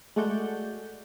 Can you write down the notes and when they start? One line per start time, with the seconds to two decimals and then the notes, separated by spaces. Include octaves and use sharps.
0.16 G#3 A3 F#4 D5 F#5 G6